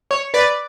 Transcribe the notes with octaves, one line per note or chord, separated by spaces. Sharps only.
C#5
B4 D5